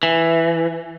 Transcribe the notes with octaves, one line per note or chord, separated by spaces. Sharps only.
E3